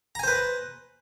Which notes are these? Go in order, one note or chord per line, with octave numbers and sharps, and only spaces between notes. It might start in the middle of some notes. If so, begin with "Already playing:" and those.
B4 C5 G#5 A#5